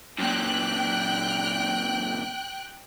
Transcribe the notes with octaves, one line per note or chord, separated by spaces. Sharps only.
F#2 A#2 G5 F#6